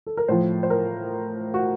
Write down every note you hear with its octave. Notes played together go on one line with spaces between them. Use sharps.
A4
A#4
A2 F3 C5
C5
A#4
F#4